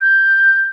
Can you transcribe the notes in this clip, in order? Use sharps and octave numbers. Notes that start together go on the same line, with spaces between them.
G6